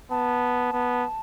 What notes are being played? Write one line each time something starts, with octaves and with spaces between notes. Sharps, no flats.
B3 A5
B3